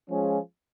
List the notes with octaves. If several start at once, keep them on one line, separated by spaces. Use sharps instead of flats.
F3 G#3 C#4 F4 G#4